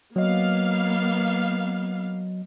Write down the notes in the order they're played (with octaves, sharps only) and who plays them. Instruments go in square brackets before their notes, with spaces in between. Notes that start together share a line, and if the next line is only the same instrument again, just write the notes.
[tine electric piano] F#3 D#5 [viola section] A#3 B3 F5